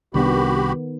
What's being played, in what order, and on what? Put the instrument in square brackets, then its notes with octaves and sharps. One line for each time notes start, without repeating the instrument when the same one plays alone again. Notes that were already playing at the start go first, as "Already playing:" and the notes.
[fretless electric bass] C2 D4 [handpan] D#3 B3 [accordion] F#4 G4 B5